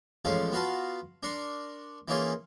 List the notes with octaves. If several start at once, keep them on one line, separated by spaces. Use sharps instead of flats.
A1 F3 G#3 C#4 A4 F5
B3 F4 F#4 B4 F5 A5
D4 A#4 C6 C#6
E3 A#3 C#4 D#4 F4 G#4